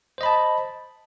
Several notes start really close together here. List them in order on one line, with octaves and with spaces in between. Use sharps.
C5 D#5 B5 A5